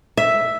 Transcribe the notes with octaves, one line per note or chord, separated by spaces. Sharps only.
E5